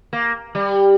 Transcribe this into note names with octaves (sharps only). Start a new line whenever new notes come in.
A#3
G3